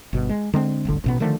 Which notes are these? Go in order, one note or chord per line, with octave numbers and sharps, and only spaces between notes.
G1 B2
G#3
D3 G#3 C4
D1 G1 D3
A1 B2 B3
D3 D#3 F3 A3